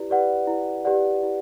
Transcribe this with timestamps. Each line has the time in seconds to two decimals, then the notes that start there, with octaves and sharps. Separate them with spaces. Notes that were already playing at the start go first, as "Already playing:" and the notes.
Already playing: E4 G4 B4 D5
0.10 G4 B4 D5 F#5
0.47 E4
0.85 G4 B4 D5 F#5
1.23 E4